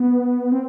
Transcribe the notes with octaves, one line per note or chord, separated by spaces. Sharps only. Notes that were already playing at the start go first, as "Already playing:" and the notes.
Already playing: B3
C4